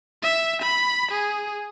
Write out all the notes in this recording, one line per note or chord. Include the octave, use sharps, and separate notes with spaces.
E5
B5
G#4